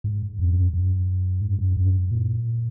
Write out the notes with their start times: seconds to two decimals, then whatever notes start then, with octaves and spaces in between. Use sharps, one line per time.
0.04 G#2
0.39 F2
0.56 F#2
0.73 F#2
1.41 G#2
1.59 F#2
1.76 F#2
2.11 A#2